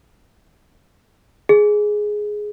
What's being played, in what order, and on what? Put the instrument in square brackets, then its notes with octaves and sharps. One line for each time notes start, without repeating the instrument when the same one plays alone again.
[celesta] G#4